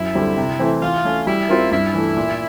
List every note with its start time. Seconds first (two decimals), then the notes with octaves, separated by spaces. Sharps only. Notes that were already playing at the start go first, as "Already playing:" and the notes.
Already playing: F#2 E4
0.15 D3 G3 C4
0.37 C3
0.59 E3 A3 C4
0.82 E3 F4
1.04 A3 C#4
1.27 G3 E4
1.49 C4 F4 A#4
1.71 G2 E4
1.94 E3 A3
2.17 A#2